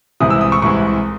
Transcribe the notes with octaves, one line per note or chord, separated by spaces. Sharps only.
C2 C3 E3 G#3 D#6
E6
D#6
C#6
C2 C3 E3 G#3 C#6